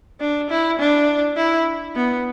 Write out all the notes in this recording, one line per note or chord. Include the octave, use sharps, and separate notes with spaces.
D4
E4
D4
E4
B3